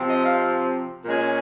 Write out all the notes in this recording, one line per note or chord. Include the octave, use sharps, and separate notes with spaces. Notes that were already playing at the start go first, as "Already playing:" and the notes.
Already playing: C3 F3 C4
D#5
F5
A#2 G#3 C#4